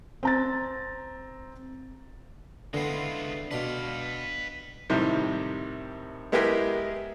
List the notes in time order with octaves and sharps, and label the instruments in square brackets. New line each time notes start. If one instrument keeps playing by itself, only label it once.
[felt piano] C4 A#5 A6
[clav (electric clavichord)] D3 [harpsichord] E3 B3 [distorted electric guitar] G#3 F4
[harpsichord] B2 C6 [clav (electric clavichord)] D4 [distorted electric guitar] B4 F5
[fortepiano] A2 C3 D#3 G3
G#3 B3 E4 G4 G#4 A#4